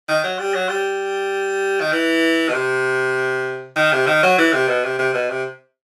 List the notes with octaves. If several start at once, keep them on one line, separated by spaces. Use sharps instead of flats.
D#3
F#3
G3
F#3
G3
D#3
E3
B2
C3
D#3
C3
D#3
F#3
E3
C3
B2
C3
C3
B2
C3